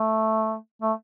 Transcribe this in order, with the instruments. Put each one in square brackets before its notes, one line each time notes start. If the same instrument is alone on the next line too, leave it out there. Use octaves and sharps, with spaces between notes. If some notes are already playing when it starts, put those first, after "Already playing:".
Already playing: [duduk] A3
A3